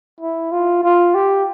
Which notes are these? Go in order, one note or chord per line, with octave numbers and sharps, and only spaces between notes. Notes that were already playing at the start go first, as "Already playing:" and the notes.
E4
F4
F4
G4